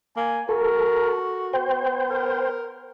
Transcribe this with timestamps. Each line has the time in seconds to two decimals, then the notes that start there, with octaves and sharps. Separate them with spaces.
0.17 A#3 G#5
0.49 F#4 A4 A#4
1.53 B3 C5 G5
2.10 A#4